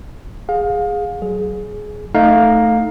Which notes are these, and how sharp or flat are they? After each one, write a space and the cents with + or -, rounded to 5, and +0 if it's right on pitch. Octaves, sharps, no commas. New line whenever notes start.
G#4 -10 F5 +30
F#3 +25 G#4 +15
A3 +10 D#4 +0 F5 +15